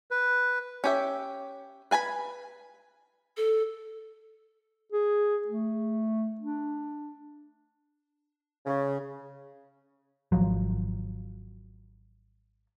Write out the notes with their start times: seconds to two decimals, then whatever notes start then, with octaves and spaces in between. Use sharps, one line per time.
0.11 B4
0.84 C#4 G4 E5
1.91 B4 G#5 A5 B5
3.37 A4
4.92 G#4
5.48 A3
6.41 D4
8.66 C#3
10.32 G#1 D#2 F3 F#3